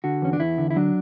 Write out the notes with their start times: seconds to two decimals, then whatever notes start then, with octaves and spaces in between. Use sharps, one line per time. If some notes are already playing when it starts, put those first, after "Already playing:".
0.04 D3 F#4
0.22 E2 C#4
0.33 D4
0.40 E2 E4
0.58 D3
0.71 E4
0.76 F#3 D4